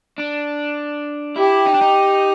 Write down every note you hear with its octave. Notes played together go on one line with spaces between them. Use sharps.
D4
E4 G4
D#4
D4
D#4